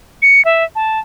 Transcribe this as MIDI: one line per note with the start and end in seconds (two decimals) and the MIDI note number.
0.22 0.44 97
0.45 0.64 76
0.75 0.99 81